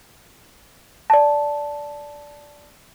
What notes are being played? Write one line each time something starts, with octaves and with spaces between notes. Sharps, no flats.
D5 A5